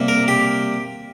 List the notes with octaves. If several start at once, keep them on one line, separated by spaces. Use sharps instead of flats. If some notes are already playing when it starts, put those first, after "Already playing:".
Already playing: C3 G3 A#3
A#4
G4